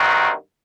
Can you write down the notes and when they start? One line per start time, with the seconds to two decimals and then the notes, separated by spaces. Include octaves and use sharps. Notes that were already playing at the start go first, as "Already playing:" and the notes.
Already playing: G2 D#3 F#3 C4 F#4